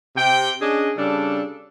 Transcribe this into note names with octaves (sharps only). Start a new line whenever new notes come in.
C3 G5
C#4 D4 G#4 D#5
C#3 G3 D4 A4